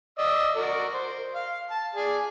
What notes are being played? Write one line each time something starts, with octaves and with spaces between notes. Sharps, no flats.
D5 D#5 E6
F#4 A#4 D5
C5
F5
A5
G#4 D5